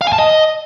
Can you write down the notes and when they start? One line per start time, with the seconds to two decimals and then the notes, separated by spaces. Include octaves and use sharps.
0.01 F5
0.07 G#5
0.13 A5
0.18 D#5